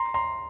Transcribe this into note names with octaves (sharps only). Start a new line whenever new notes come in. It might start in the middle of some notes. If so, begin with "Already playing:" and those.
Already playing: A#5 C6
A#5 C6